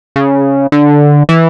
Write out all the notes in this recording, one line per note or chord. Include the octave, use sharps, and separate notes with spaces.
C#3
D3
E3